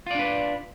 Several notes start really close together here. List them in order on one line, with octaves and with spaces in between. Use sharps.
F4 D5 D4 B4